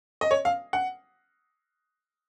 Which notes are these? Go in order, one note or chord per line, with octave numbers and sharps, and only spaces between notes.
D#5
C#5
F5
F#5